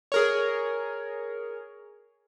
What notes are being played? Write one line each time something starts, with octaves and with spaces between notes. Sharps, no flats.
G#4 A#4 C#5